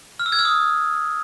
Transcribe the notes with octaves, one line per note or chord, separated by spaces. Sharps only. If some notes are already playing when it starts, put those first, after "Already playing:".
F6
E6
G#6
F6
D#6